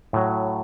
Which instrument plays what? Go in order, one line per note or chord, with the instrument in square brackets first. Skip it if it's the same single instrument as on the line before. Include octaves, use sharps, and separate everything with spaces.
[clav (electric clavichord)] A2 F#3